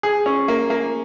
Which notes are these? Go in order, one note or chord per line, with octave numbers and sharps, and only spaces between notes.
G#4
C#4
A#3
A#3